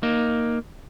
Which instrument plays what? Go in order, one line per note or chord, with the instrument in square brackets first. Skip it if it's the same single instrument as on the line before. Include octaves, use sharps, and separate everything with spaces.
[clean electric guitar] A#3 D#4